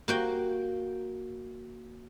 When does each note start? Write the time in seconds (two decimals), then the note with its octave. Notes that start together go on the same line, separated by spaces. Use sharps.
0.08 A#3 F#4 G5